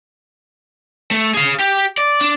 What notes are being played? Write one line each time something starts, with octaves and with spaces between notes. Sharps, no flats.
A3
G#4 F5
G4
D5
D4